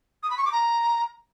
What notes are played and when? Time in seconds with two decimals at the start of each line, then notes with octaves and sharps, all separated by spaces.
0.23 D#6
0.30 B5
0.37 C#6
0.45 D6
0.52 A#5